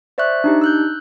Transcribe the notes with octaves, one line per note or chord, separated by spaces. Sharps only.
C5 D5 E5 C#6 F#6
D4 D#4 G4
E6 F#6 G6